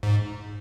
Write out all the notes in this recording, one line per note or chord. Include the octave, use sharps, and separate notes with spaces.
G#2